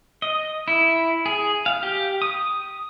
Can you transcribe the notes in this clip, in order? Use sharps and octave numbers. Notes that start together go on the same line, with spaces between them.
D#5
E4
G#4
F5
G4
D#6